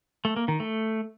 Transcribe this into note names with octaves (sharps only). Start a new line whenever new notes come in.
A3
A#3
D#3
A3